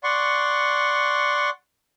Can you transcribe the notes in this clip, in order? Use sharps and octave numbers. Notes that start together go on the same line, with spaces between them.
D5 F#5 C6 C#6